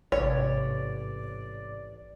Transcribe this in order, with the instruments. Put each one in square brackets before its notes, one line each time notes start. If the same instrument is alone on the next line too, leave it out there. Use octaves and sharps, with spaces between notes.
[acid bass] A1 [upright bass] G#2 C3 [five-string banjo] C#5 [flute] D5